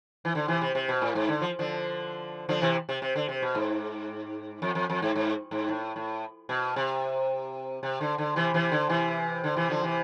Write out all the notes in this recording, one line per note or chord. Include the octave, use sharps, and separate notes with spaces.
E3
D3
C3 E3
C3
C3
B2
A2
G#2
D3
F3
D3 F3
D3 F3
C3 E3
C3
C3
D3
C3
B2
G#2
F2
F2
F2
G#2
G#2
G#2
A2
A2
B2
C3
C3
D3
D3
C3 E3
C3 E3
D3
C3 E3
D3
C3 E3
D3 F3
C3 E3